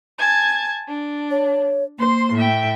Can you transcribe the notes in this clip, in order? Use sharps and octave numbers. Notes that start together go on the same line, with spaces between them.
G#5 A5 G#6
D4
C#5
A#3 C5 C6
A2 E5 G5